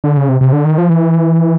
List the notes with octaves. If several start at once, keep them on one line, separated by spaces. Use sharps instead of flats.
D3
C#3
C3
C3
D3
D#3
F3
E3